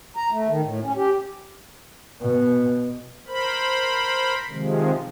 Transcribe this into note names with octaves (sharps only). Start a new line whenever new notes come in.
A#5
A3
D#3
A2
C#4
G4
B2
A#4 C5 B5
C3 D#3 F3 G#3